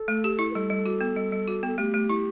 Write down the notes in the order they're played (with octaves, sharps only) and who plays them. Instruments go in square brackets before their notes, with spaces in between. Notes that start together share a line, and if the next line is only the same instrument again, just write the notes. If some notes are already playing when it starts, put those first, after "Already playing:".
Already playing: [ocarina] A4
[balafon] A3
G4
E4
[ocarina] B4
[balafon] G3 [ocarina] A4
[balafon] G3
F#4
B3
G3
G3
F#4
[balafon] B3 [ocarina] A4
[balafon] A3 [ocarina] G4
[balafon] A3
E4